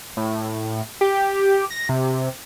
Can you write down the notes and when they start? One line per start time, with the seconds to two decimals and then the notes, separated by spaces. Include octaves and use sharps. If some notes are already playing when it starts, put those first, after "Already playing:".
0.17 A2
1.01 G4
1.71 A#6
1.89 C3